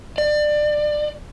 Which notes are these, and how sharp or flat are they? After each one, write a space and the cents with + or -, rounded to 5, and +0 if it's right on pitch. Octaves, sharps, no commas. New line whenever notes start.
D5 +25